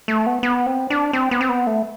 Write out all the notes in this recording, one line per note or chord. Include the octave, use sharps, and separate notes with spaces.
A3
B3
B3
C4
D4
C4
B3
C4
B3
A3